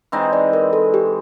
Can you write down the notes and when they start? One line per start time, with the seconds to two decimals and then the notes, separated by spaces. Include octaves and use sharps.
0.12 E3 G#3 C4 D#4
0.33 D5
0.53 A#4
0.73 A4
0.94 G4